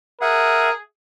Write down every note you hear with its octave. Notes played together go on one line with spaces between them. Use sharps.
G#4 A#4 E5 F#5